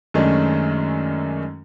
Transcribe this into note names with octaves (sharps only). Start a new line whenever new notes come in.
F#2 D#3 G#3 A3 C#4 D4